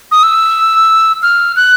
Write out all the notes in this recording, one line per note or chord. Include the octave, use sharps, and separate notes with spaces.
D#6
E6
F6
F#6